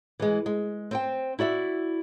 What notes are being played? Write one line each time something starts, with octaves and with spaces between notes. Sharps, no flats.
E3 G#3
G#3
C4 C5 G5
E4 F#4 D5 E5